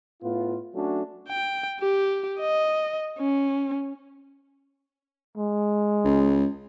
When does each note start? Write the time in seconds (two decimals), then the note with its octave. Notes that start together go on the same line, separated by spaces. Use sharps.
0.23 A2 B3 F4
0.74 F#3 A3 C#4 D4 F#4
1.29 G5
1.80 G4
2.40 D#5
3.19 C#4
5.38 G#3
6.05 C#2